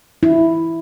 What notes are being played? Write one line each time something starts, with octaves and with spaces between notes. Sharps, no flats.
E4